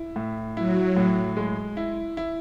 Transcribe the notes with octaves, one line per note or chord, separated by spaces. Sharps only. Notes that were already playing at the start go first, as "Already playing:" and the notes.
Already playing: E4
A2
F#3 E4
A2
G#3
E4
E4